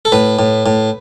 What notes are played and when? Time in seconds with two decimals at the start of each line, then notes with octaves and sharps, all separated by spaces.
0.05 A4
0.12 A2 B4
0.39 A2
0.66 A2